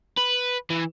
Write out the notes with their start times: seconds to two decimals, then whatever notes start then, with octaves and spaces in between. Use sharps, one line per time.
0.18 B4
0.70 E3